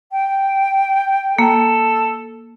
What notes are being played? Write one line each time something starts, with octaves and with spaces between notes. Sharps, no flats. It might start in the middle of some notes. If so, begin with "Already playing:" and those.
G5
A#3 A4